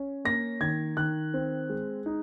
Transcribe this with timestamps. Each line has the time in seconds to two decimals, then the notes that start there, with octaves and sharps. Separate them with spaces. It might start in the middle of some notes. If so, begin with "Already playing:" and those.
Already playing: C#4
0.25 A#3 A#6
0.61 D#3 G#6
0.97 D#3 F#6
1.34 C4
1.69 G#3
2.06 D#4